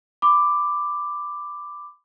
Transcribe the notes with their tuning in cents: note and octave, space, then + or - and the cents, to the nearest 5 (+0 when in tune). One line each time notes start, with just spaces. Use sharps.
B5 +25 D6 +5